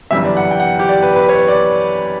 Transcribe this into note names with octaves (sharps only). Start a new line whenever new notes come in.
G1 F#2 E3 G3 E5
D5
F#5
G5
F#5
G4
D5
B4
B4
C#5
D5